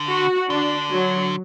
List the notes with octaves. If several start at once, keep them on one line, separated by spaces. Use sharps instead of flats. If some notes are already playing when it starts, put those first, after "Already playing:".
Already playing: D3
F#4
D3 D4
F#3